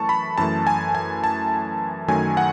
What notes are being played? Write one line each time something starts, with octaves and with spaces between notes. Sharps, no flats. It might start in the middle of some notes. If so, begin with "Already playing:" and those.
Already playing: F#2 E3 A3 A5 C#6
B5
F#2 E3 A3 A5
G#5
G#5
A5
F#2 D#3 F#3 A3 G#5
F#5